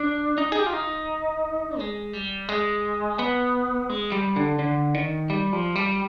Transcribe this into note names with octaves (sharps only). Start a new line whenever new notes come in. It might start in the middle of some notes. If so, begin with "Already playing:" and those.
Already playing: D4
D#4
G#4
G4
F4
D#4
G#3
G3
G#3
B3
G#3
G3
D3
D3
D#3
G3
F3
G3